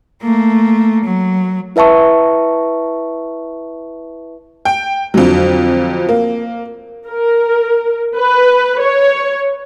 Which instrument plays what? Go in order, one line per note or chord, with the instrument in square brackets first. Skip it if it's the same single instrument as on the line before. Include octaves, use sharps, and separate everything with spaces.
[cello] A3 A#3
F#3
[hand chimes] E4 B4 E5 A5 C#6
[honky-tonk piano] G5
F2 D3 F#3
A#3
[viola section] A#4
B4
C#5